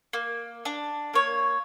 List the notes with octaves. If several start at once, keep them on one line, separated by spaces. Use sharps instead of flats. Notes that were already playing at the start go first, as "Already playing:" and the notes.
A#3
D4
A#3 C#5